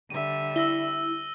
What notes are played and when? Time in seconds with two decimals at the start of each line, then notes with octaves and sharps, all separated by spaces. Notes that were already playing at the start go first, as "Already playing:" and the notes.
0.10 D3 G3 E5 D#7
0.56 E4 E6 A#6 G7